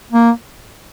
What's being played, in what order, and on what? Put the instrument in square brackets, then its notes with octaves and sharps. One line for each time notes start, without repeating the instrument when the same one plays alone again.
[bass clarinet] A#3